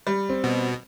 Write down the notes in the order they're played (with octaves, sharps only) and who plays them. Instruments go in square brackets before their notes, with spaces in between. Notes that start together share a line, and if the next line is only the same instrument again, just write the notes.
[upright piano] G3
[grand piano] C4
[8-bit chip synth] B2